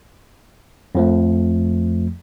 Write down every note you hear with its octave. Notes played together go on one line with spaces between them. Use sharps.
F2 F3 A3